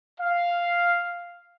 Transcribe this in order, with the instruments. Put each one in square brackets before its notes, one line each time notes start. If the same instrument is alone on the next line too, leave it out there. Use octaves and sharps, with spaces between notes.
[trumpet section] F5